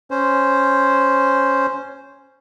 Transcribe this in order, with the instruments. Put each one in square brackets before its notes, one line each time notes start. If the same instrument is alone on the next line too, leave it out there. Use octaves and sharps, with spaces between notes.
[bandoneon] C#4 C5